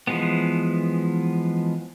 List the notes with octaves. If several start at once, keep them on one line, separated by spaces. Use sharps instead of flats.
E3 F3 G#3 B3